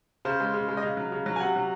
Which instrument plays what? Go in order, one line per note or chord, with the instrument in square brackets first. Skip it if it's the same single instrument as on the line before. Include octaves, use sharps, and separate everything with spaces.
[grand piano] C#3 C5
G#3
C#3
G#3
D#5
C#3 F5
F#3
C#3
F#3
G#5
C3 F#5
F#3